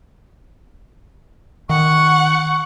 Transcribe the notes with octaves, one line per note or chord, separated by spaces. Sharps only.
D#3 F#5 C#6